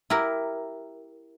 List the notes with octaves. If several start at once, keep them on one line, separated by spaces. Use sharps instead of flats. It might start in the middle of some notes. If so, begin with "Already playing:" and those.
E4 G4 A#4